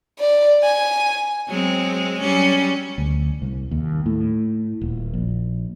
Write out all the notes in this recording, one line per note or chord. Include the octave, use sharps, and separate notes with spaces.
D5
G#5
F#3 G#3 C4
F#3 G3 C#4
D2
C2
D#2
A2
D#1
A#1